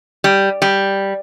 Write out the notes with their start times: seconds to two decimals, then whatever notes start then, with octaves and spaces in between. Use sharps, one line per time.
0.24 G3
0.62 G3